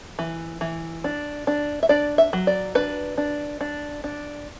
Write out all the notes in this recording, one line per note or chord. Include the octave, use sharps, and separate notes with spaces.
E3
E3
D4
D4
E5
D4 D5
E5
F#3
D5
D4 B4
D4
D4
D4